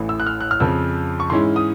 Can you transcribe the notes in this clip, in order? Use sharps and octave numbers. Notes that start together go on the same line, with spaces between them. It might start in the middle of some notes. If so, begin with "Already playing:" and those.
Already playing: A1 A2 E3
E6
F#6
F6
F#6
F6
F2 C#3 F3 E6
C#6
G#2 E3 G#3 C#4 E4 C6
D#6